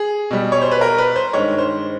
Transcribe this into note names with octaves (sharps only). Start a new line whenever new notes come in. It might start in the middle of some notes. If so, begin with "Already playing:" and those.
Already playing: G#4
B2 G3
C#5
C5
B4
A#4
B4
C5
G2 D#3 G#3 C#5
C5